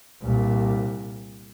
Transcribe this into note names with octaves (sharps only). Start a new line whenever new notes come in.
C2 A#2